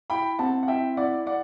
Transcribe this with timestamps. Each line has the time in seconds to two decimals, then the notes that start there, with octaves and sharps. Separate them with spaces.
0.10 E4 G5 B5
0.39 C4 F#5 A5
0.63 F#5
0.68 E4 E5 G5
0.97 E4 D5 F#5
1.26 D5 F#5